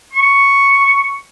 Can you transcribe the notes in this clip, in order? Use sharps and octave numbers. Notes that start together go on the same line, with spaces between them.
C#6